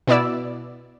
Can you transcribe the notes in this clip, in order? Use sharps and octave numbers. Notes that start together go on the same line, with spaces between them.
B2 B3 E4 D5 E6